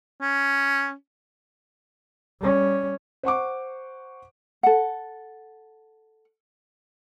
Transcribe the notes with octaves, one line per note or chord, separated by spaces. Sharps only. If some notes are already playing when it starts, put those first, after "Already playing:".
C#4
G3 C#4
C5 F#5 C#6 D6
A4 F#5